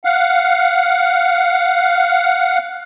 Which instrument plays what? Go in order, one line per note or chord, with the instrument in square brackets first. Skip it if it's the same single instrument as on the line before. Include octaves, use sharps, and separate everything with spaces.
[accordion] F5 F#5